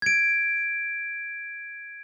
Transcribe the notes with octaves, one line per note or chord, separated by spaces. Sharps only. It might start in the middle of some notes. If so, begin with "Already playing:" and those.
G#6 D7